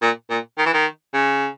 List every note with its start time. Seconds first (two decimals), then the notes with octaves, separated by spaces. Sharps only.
0.02 A#2
0.30 A#2
0.58 D#3
0.66 E3
0.74 D#3
1.13 C#3